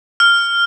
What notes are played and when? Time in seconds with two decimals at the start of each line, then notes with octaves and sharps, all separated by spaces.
0.20 F6